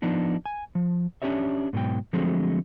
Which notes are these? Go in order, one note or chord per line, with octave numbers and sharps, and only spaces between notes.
F3 B3 D4 D#4
G#5
F3
C#4 D4 G4 C#5 E5
G#2 B2 F#3 G5
D3 F3 F#3 G#3 A3 C4